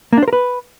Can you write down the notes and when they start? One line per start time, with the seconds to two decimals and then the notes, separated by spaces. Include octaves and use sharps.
0.13 A#3
0.18 D4
0.23 C5
0.28 A#4
0.33 B4